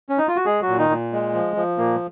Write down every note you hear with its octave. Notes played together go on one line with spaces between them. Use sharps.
C#4
D#4
F4
F#4
G#3 G#4
F#3 F#4
A#2
D#3 D#4
A#2
G#3
F3
F3
A#2 A#3